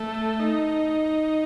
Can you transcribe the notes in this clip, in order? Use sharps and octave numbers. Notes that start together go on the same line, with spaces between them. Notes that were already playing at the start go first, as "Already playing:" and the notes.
Already playing: A3
D#4